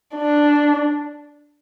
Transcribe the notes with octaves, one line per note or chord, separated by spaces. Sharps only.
D4